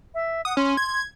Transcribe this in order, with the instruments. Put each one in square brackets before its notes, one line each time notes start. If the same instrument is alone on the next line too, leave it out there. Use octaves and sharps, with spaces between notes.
[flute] E5
[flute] F#5 [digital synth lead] D#6
[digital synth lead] C#4 [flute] C6
[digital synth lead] G#6